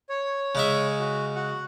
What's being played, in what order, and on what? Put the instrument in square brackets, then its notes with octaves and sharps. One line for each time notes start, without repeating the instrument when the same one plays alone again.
[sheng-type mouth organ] C#5
[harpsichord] C#3 G#3 E5
[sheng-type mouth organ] F#4
F#4 F#5